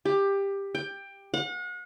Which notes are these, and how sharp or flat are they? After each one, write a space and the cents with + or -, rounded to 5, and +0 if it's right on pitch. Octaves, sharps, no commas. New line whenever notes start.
G4 +15
G5 +15
F#5 -40